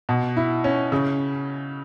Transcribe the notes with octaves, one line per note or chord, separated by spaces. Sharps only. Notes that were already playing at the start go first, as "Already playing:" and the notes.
B2
E4
C#4
C#3